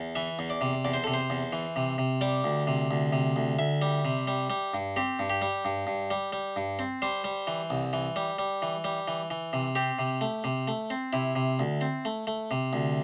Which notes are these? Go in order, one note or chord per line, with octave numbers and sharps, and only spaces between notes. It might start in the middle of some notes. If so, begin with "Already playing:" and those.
Already playing: E2
E3 E5
E2
D5
C3
E2 D5
C5
C3 A4
C5
E2
E3
C3
C3
G3 D5
D2
C3
D2
C3
D2
D2 E5
G3
C3
G3
G3
G2
C4 G4
G2
G4
G3
G2
G2
G3
G3
G2
C4
G3 C5
G3
E3
C2
E3
G3
G3
E3
G3
E3
E3
C3
C4 G4
C3
A3
C3
A3
C4
C3 E4
C3
D2
C4
A3
A3
C3
D2